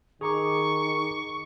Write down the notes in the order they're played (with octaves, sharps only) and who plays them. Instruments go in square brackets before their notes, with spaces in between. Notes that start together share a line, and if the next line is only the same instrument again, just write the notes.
[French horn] D#3 [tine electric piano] G#4 A#5 D6 [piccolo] C#6